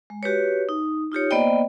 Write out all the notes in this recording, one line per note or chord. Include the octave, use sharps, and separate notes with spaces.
G#3
F#4 G4 B4 C#5
D#4
D#4 F4 G4 C#5
A#3 B3 C5 D5 D#5 G5